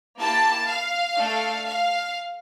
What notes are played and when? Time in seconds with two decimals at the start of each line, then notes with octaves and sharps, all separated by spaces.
0.19 A#3 E4 G4 A5
0.69 F5
1.17 A3 D4 A4
1.66 F5